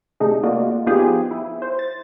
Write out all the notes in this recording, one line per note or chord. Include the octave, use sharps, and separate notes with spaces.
C3 A3 D4 D#4 G#4
A3 A#3 F4 F#4 D5 D#5
F3 B3 D#4 F4 G4 G#4
E4
C5
A6